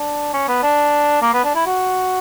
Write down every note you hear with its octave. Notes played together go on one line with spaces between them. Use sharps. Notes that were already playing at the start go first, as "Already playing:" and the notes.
Already playing: D4
C#4
B3
D4
A#3
B3
D4
E4
F#4